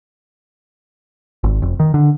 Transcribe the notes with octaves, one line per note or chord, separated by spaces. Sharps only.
G#1
F1
D#3
D3